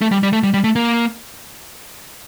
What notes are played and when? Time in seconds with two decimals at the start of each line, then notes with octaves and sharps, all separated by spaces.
0.01 A3
0.11 G3
0.23 G3
0.33 A3
0.43 G3
0.54 G3
0.64 A3
0.76 A#3